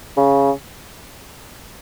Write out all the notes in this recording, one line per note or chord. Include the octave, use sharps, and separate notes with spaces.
C#3